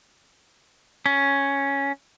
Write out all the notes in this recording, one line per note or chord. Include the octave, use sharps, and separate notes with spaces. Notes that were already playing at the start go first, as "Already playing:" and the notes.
C#4